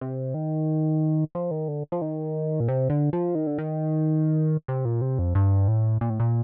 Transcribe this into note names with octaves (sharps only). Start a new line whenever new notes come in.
C3
D#3
F3
D#3
D3
F3
D#3
A#2
C3
D3
F3
D#3
D3
D#3
C3
A#2
C3
F2
G2
A2
A#2
A2
A#2